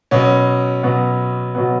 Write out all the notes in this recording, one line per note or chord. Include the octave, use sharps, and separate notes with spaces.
B2 F#3 B3 C#4
B2 F#3 B3
B2 F#3 B3